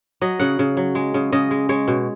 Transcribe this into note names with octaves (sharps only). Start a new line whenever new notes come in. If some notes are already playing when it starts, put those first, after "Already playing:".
F#3 D#5
C#3 F#5
C#3
F#3
G#3
C#3
C#3 D#5
G#3
G#3 C#5
B2